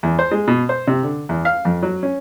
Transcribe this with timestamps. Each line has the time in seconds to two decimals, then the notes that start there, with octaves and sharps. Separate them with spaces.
0.03 E2
0.19 C5
0.31 G#3
0.47 B2
0.69 C5
0.87 C3
1.03 D3
1.29 E2
1.45 F5
1.65 F2
1.83 F#3
2.03 C#4